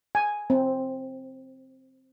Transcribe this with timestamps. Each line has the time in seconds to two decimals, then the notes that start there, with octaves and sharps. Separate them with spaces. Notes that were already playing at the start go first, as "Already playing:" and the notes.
0.15 G#5
0.50 C4